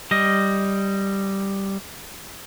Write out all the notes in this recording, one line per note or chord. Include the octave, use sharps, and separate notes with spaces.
G3 D#5